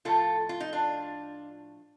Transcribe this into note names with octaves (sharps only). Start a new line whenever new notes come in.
A2 F3 A3 F4 A4
F4
D#4
D4 F4